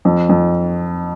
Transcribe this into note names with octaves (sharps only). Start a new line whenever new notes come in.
F2
F2